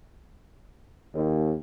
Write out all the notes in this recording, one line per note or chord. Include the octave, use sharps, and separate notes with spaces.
D#2